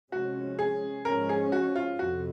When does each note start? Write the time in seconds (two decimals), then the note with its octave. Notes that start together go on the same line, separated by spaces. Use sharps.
0.11 C3 F3 G#3 C#4 F#4
0.59 G#4
1.05 G#2 F3 G#3 C#4 A#4
1.29 G#4
1.52 F#4
1.76 F4
1.98 F2 C3 F#4